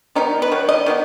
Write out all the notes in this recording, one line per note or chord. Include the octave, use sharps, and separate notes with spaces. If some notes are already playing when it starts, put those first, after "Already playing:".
D#3 F#3 B3 D#4
B4
D#3 F#3
D#5
D#3 F#3 B3